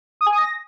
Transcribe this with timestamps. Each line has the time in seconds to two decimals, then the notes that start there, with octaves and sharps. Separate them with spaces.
0.21 D#6
0.26 G#5
0.32 D#6
0.38 A#6